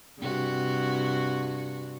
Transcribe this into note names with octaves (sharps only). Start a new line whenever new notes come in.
G2 C3 F#4